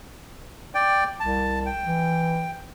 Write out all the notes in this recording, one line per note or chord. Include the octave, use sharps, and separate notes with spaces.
D5 G5
C2 A5
G5
E3